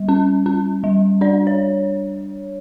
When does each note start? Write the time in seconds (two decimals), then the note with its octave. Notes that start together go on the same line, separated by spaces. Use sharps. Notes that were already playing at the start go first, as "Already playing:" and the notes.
Already playing: G3
0.08 C#4
0.46 C#4
0.84 G3
1.21 D4 D5
1.47 C#5